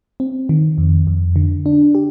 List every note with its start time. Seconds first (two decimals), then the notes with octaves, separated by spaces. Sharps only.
0.20 C4
0.49 D#3
0.78 F2
1.07 F2
1.36 D3
1.66 D4
1.95 G4